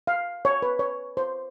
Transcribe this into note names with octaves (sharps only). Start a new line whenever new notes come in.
F5
C#5
B4
C#5
C5